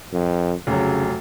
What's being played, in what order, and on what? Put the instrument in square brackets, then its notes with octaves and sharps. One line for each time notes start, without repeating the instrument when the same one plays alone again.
[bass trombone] F2
[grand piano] F1 F#3 [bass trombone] C#3